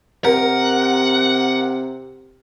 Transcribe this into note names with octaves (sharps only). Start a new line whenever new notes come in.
C3 A#4 F#5